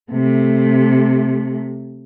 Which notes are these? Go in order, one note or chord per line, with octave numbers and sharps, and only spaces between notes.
C3 A3